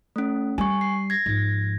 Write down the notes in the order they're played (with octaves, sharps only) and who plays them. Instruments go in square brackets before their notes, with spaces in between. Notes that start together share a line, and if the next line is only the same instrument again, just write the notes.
[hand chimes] A3 C#4
[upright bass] G3 [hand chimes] G#5 C#6
[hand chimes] C7
G#6 A#6
[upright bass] G#2 F3